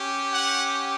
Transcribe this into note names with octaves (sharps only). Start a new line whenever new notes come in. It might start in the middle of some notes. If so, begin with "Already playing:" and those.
Already playing: C#4 G4
F#5